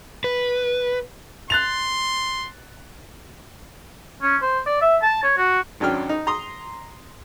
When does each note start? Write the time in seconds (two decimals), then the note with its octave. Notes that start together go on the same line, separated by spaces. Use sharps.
0.24 B4
1.50 C6 F#6 A6 F7
4.22 C#4
4.42 C5
4.66 D5
4.82 E5
5.02 A5
5.23 C#5
5.38 F#4
5.80 G#1 F#3 C#4 D4 G5 F6
6.09 D#4
6.27 A#5 C6 D#6